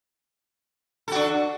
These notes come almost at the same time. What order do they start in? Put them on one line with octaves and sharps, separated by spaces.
A4 F#4 D4